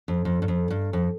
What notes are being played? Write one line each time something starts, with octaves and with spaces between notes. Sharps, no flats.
F2
F2
G2
F2
G2
F2